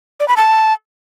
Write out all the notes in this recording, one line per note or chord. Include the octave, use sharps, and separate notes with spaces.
D5
B5
A5